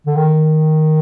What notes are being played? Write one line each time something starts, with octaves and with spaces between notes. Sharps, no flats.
D3
D#3